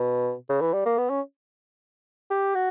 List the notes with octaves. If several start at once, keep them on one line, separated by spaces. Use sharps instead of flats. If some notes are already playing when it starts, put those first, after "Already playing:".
Already playing: B2
C#3
E3
G3
A#3
B3
C#4
G4
F#4